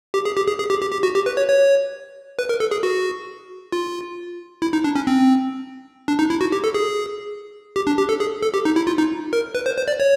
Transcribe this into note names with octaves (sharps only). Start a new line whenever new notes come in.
G4
G#4
G4
G#4
G#4
G4
G4
G4
F#4
G4
B4
C#5
C#5
B4
A#4
A4
G#4
F#4
F4
E4
D#4
D4
C#4
C4
D4
D#4
E4
F#4
G4
A4
G#4
G4
D4
G4
A4
G#4
A4
G4
D#4
E4
F4
D#4
A#4
B4
C5
C5
D5
C#5